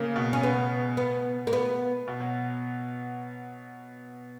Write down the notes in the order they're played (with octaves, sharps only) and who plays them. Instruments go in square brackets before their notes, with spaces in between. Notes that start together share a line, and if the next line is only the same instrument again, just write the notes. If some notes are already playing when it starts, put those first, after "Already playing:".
Already playing: [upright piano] C#3 [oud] A#3
[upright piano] B2
[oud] C#4
B3
B3
A#3
B3
[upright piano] B2
F#3